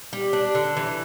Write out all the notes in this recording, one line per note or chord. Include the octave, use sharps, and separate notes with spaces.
G3
D4
D3
E3